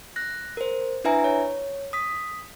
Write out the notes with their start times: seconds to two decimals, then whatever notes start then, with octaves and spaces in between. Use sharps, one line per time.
0.16 F#6 A#6
0.57 A#4 C5
1.04 D4 E4 B4 E5 G#5 A#5
1.24 C#5
1.93 D#6 B6